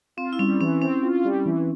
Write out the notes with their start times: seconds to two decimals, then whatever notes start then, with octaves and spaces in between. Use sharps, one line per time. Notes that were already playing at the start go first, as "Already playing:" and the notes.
0.17 C4 F4
0.33 E4
0.39 G3 C#4
0.61 E3 C#4
0.82 C4 C#4
1.03 F4
1.25 G3
1.46 E3